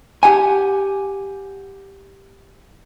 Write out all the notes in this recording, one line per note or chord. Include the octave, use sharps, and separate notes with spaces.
G4 F#5 G#5